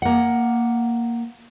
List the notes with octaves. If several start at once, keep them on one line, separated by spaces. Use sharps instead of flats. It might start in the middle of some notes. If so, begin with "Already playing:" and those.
A#3 F#5